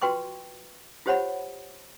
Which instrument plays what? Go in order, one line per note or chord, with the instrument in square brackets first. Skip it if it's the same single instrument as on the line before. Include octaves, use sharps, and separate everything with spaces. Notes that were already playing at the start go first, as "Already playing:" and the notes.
[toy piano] F4 F#4 B4 G5 C6 C#6
F4 G4 C5 C#5 F#5 B5